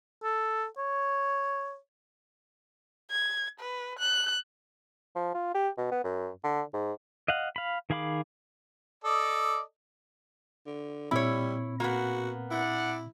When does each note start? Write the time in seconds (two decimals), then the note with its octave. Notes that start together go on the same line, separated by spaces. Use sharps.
0.23 A4
0.78 C#5
3.10 G#6
3.60 B4
3.99 F#6
5.16 F3
5.34 F4
5.54 G4
5.78 B2
5.92 B3
6.04 F#2
6.44 D3
6.73 G#2
7.28 D#5 F5 F#5
7.56 F5 B5
7.90 D#3 G#4 F5 B5 D6
9.04 A4 D5 D#5
10.66 D3
11.11 A#2 G3 C4 E4 C#5 B5
11.80 A#3 B3 F#4
12.51 D4 E4 D5 F#5